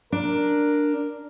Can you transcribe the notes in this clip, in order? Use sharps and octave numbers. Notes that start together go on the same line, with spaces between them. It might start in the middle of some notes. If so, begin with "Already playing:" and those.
D4 A#4